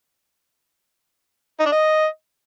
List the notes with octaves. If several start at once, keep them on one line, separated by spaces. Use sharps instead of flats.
D#4
D4
D#5